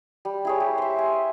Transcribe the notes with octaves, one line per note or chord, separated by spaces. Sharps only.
G3
E4 G#4 C#5
G4
C5 E5
G#5